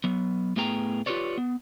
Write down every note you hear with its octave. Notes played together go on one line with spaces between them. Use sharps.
F#3 B3
A2 A3 B3 G#4 G5 A#5
F4 G4 A#4 B4 C#5 D5
B3